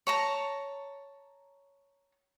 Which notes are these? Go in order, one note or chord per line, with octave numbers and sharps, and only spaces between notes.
C#5 A5 A#5